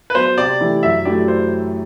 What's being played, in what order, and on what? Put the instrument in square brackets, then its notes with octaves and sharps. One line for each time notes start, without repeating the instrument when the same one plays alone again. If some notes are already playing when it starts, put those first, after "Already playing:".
[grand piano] B4
[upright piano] F#3 B3 [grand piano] C5
[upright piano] C3 [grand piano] D5
[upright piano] E3 A3 E4 G4
[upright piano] F#2 [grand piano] E5
[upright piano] F#3 A3 E4 G4 [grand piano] D5
[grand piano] C5